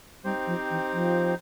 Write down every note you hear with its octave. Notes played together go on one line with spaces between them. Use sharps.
G3 C4 D#4 G4 C5
F3
E3
F3